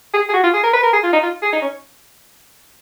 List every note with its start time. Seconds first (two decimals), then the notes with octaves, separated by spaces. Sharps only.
0.14 G#4
0.29 G#4
0.33 F#4
0.43 F4
0.54 G#4
0.63 A#4
0.73 B4
0.83 A#4
0.93 G#4
1.03 F4
1.13 D#4
1.23 F4
1.42 G#4
1.53 D#4
1.62 C#4